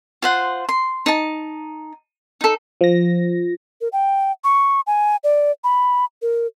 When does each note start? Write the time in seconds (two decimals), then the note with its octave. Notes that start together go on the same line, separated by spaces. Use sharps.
0.22 F4 C5 F#5
0.69 C6
1.06 D#4 A5
2.41 D#4 A4
2.81 F3 A#6
3.81 A#4
3.93 G5
4.44 C#6
4.87 G#5
5.24 D5
5.64 B5
6.22 A#4